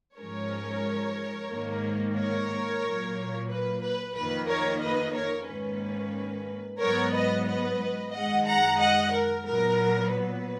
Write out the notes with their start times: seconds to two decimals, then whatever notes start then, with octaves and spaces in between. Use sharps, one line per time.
0.17 G#2 F3 G#3 C#4 A#4 C#5
1.50 G#2 D#3 A#3
2.16 A#4 C#5
2.82 A#2 F#3 A#3
3.49 B4
3.82 B4
4.15 F2 D#3 A#3 B4
4.48 A#4 C#5
4.81 B4 D#5
5.15 A#4 C#5
5.47 G#2 D#3 A#3 C#4 B4
6.80 G#2 F#3 B3 A#4 C#5
7.13 B4 D#5
7.47 B4 D#5
8.13 F#2 D#3 G#3 D#5 F#5
8.47 F#5 A#5
8.79 D#5 F#5
9.12 A#4
9.46 A#2 F#3 B3 A#4
10.13 B4